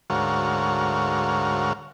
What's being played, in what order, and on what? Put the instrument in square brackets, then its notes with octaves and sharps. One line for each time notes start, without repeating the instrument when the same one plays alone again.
[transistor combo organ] D2 G#2 F#4 A#4 C#5 F5